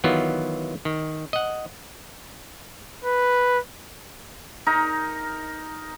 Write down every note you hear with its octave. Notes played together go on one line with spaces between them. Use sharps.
D#3 E3 F#3 B3 F4
D#3
D#5 F#5
B4
D#4 A#4